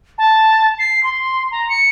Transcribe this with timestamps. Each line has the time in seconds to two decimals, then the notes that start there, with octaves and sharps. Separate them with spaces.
0.18 A5
0.79 C7
1.04 C6
1.52 A#5
1.69 C#7